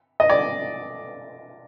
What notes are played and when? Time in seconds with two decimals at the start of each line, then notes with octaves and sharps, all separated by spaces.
0.20 D#5
0.30 D5